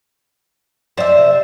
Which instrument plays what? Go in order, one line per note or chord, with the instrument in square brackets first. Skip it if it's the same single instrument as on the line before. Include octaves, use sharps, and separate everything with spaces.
[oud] F#2 F3 D5 [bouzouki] C5 E5
[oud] C3